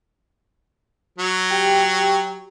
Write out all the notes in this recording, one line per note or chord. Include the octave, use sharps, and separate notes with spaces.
F#3
G4 G5